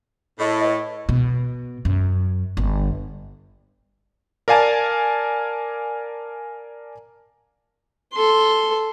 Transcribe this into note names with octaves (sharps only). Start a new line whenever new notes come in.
A2 G#4 D#5
B4 D#5
B2
F#2
G1
A#4 D5 F5 G#5 A5 A6
A4 C6